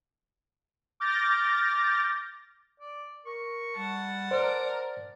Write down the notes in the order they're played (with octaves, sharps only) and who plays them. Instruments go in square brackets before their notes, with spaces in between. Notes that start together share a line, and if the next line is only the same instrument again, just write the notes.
[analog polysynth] D6 F6 G6 A6 A#6
[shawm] D5
[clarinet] A#4 [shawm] C#6
[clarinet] G3 [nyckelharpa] F#5 A5
[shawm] A#4 [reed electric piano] C5 [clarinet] D5
[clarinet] D5